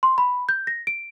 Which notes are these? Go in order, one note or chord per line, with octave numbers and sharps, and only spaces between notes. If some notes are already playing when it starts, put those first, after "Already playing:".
C6
B5
G6
A#6
D7